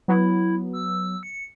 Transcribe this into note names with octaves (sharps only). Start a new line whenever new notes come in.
F#3 B3 E4
E6
C#7